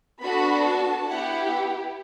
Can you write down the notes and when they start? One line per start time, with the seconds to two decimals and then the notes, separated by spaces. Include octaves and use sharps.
0.21 B3 D4 F#4 A4 B5
0.64 A5
1.07 B3 E4 G4 F#5